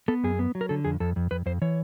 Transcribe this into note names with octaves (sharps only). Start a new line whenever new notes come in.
B3 A4
F#2 G#4
B3
F#3
A#4
D3 A4
F2 G#4
F2 A4
F2
F2 B4
F2 C5
E3 C#5